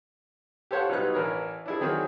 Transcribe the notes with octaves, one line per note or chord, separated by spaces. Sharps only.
G4 A4 C5 C#5 F5 F#5
B1 F#3 G3 D#4 B4 F#6
A1 E3 A#4 C#5
D4 E4 G#4
D#3 F#3 C4 G#4 C#5